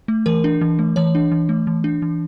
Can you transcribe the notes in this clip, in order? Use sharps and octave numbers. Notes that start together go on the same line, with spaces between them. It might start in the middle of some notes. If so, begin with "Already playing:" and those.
A3
E3 A#4
D4
E3
A3
E3 C#5
D4
E3
A3
E3
D4
E3